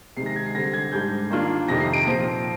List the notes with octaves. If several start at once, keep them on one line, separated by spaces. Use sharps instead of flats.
C3 D#3 G#3 C7
A#6
G#6
C7
D3 G3 C4 A#6
G#6
G#2 G3 D4 G6
D#3 A#3 D4 F4
F2 C3 D#3 A#6
C7
D7
A#2 F3 C4 A#6